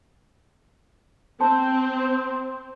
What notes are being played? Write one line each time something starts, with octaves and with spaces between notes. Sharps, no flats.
C4 C5 A5 E6